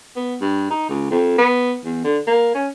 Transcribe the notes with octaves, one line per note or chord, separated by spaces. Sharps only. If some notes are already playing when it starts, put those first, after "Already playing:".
B3
G2
D#4
C#2
F2
B3
E2
D3
A#3
C#4